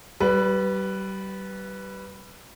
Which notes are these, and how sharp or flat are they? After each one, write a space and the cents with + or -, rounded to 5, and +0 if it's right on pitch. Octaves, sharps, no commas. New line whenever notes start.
G3 -30 B4 +0